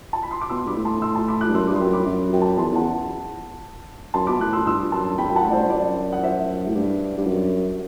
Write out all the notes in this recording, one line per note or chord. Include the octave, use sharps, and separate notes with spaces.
A5
B5
C6
D6
B2 C6 E6
G2 B5 D6
A2
A5 C6
C6 E6
A5 C6
B5 D6
D6 F#6
G2
F#2 C6 E6
G2 B5 D6
C6
F#2 G5 B5
B5 D6
F#2
F#2 G5
A5
B5
E2 A5 C6
E2 F#5 A5
F#2 A5 C6
B2 B5 D6
A2 D6 F#6
C6 E6
G2 C6 E6
F#2 A5 C6
E2 G5 B5
G2
G5
F#2 F#5 A5
A2 D5
C5
G2
F#2 D5
F#5
C5 E5
A2
G2
G2
F#2